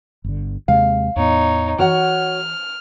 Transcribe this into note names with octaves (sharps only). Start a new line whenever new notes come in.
G1 D3
D#2 C3 G#3 F5
E2 A2 B3 D#4 C#5
E3 F#4 C#5 F#5 F6